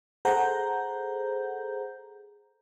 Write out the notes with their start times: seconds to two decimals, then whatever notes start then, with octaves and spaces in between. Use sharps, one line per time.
0.25 G#4 A4 C5 F#5 A#5 G6